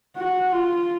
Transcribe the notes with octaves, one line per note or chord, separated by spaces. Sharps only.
F#4
F4